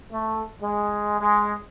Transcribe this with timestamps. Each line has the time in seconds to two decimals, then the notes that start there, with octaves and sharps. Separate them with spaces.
0.10 A3
0.60 G#3
1.19 G#3